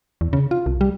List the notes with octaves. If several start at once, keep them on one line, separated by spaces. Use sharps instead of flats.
E2
C#3
F4
C2
G3